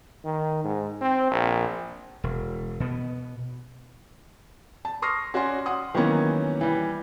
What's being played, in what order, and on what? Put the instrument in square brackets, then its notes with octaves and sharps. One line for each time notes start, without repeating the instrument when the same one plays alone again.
[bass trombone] D#3
G#2
C4
A#1
[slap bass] E1
B2 B3
[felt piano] A5
C6 C#6 D#6 F6 A#6 C7
C#4 F#4 D5 G#5 C6
F#5 C6 D#6
D#3 E3 F#3 A#3 B3 C#4
E3 G3